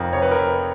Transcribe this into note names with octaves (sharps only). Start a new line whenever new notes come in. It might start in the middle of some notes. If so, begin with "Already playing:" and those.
Already playing: F1 F2 A#4
F1 C#5
B4
A#4
F2 B4